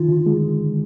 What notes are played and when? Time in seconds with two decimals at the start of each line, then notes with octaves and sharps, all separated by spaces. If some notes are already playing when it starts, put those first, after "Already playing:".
Already playing: D#3 F4
0.08 D3
0.26 G#3